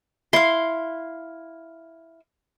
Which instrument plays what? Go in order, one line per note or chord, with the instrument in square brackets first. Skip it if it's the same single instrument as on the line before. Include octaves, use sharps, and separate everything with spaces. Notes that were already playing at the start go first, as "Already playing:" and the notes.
[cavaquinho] E4 F5 [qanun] C6